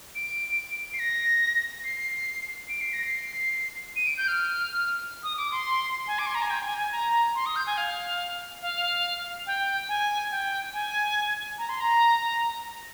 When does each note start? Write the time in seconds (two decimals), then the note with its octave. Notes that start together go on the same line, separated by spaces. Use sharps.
0.15 D7
0.94 C7
0.99 A#6
1.84 C7
2.69 D7
2.81 C7
2.93 A#6
3.04 C7
3.96 D#7
4.06 D7
4.17 G6
4.28 F6
5.23 D#6
5.37 D6
5.51 C6
6.07 G#5
6.19 D6
6.26 C6
6.35 A#5
6.42 G#5
6.50 G5
6.64 G#5
6.78 G#5
6.92 A#5
7.35 C6
7.46 D#6
7.56 G6
7.67 G#5
7.77 F5
8.62 F5
9.47 G5
9.89 G#5
10.31 G5
10.74 G#5
11.58 A#5
11.69 C6
11.80 A#5